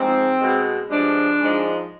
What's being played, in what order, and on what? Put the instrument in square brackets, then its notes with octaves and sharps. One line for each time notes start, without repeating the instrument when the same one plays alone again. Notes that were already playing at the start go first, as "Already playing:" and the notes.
Already playing: [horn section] G#2 F3 G#3 C4
G#3
B2
G2 F3 G#3 D4
G#2 F3 G#3